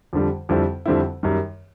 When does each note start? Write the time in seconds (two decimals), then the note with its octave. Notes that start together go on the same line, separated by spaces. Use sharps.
0.13 F2 D3 G3
0.49 F2 D3 G3 C4 E4
0.86 F2 D3 G3 C4 E4
1.23 F#2 D#3 G3